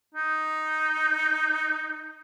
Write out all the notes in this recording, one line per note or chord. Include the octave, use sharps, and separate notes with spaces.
D#4